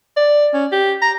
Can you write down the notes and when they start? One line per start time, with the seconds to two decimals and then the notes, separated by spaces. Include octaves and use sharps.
0.17 D5
0.54 C#4
0.72 G4
1.02 A#5